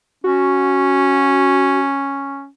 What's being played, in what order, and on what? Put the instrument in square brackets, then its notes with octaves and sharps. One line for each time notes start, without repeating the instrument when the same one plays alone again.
[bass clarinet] C#4 [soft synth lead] F#4